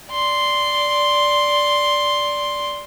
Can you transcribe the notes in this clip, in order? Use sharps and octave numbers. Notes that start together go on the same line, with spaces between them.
D5 C6